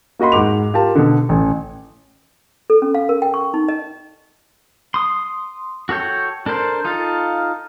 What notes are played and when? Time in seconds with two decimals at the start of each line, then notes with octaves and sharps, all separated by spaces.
0.19 A#3 F#4 D#5 B5 C6
0.32 G#2 F#5 D6 F7
0.74 F4 G4 A#4 A5
0.95 B2 D3
1.29 A1
2.70 A4
2.82 C#4
2.95 F5
3.09 A#4
3.22 G5
3.34 C#6
3.54 D#4
3.69 D#5
4.94 C6 D#6
5.89 F#4 A4 C#5 G5
6.46 D4 A4 A#4 C5
6.85 D#4 F4 A4 F5